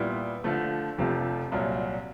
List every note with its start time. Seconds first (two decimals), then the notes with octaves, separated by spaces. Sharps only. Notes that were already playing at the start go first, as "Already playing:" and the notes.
Already playing: A#2 G3 B3 E4
0.44 D3 F3 A3
0.98 F1 F2 C3 F3 A3
1.52 C2 A#2 F#3